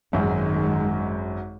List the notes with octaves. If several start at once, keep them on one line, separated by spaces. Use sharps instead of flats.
G#1 F#2 D#3 G#3